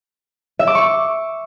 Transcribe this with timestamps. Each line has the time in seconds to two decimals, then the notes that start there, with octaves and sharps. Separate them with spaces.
0.59 E5
0.67 D6
0.75 C#6